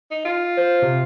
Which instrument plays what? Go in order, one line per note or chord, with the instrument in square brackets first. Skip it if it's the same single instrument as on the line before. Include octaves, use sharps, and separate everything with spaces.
[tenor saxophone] D#4
F4
[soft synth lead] C5
C3